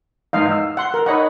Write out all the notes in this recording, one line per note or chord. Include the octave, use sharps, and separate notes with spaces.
E2 G#2 D#5 F5
E6
F#5 C6
A#4
D#4 C#5 D#5 F#5 B5